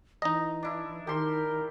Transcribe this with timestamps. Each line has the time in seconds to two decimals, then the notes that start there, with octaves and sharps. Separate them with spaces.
0.22 E3 D#4 D#5 A#5
0.63 D4 E4
1.07 D#3 G4 A#4 C6